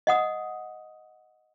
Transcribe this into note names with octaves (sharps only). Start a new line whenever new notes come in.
D#5 F#5 D#6